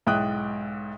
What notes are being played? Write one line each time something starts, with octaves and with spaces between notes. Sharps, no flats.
B1 G#2 E4 G5 D#6 F#6